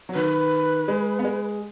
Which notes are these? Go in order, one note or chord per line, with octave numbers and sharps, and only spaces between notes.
F#3
D#3 B4
G#3
B3
G#3